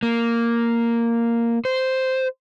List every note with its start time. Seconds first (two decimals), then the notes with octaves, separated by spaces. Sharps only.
0.03 A#3
1.65 C5